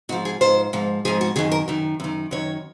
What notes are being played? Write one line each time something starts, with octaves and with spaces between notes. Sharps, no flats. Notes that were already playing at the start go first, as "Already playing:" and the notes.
G#2 F3 F#4
G#4
G#2 F3 C5
G#2 F3
G#2 F3 G#4
F#4
F#2 D#3 G#4
A#4
F#2 D#3
F#2 D#3
F#2 D#3 C#5